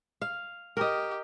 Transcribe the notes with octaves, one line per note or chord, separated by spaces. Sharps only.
F5
G4 A#4 D#5